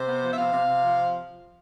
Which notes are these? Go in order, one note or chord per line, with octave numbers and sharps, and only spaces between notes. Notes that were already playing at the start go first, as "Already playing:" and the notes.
Already playing: C3 C5
B3
F3
E5
C3 F5
C3
C3
F3